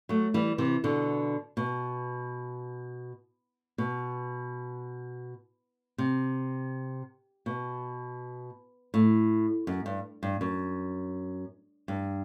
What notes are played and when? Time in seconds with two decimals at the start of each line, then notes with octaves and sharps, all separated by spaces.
0.09 F#3 A3
0.34 E3 G3
0.58 C3 E3
0.84 B2 D3
1.57 B2
3.78 B2
5.98 C3
7.46 B2
8.94 A2
9.67 F#2
9.86 G2
10.23 G2
10.41 F#2
11.88 G2